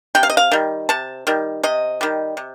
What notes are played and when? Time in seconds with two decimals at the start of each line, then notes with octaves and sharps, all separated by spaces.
0.15 C3 G5
0.23 F5
0.30 D#5
0.37 F5
0.51 D#3 G3
0.89 C3 A5
1.27 D#3 G3
1.63 C3 D#5
2.01 D#3 G3
2.37 C3